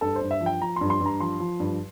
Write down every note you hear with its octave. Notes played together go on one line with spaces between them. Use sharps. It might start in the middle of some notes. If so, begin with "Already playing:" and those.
G2 A4
C5
G2
E5
F3
G5
F3 A#5
G2 C6
C6
G2
A#5
F3 C6
F3
G2